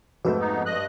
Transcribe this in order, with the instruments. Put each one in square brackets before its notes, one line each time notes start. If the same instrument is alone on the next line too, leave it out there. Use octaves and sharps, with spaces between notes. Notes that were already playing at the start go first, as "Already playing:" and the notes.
[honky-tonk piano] F2 G#2 A3 [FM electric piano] F#4 B4 E6
[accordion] B3 D#4
G2 D#5 F#6